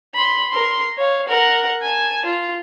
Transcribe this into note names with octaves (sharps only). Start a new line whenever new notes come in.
B5 C6
A#4 C6
C#5 F5
A#4 F#5
G#5 A5
F4